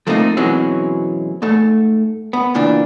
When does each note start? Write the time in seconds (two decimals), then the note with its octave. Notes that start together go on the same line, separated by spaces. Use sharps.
0.07 F3 A3 A#3 C4 D#4
0.37 B2 E3 F#3 G#3 C4 C#4
1.42 G#2 A3
2.33 B3
2.54 C#2 A#2 E3 D4